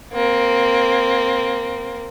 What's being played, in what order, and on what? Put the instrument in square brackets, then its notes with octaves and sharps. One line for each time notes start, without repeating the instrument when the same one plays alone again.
[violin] A#3 C4